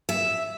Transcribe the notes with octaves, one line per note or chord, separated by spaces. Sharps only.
E5